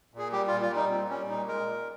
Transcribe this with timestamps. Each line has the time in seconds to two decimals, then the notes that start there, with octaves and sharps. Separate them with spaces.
0.14 A#2 G#4
0.32 G3 G4
0.47 A#2 F4
0.61 F4
0.71 G3 D#4
0.90 A#2 C4
1.09 G3 C#4
1.28 A#2 D#4
1.47 G#3 A#4
1.66 A#2